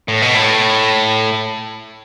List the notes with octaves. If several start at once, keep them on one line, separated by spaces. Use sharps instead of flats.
A2
B2
A2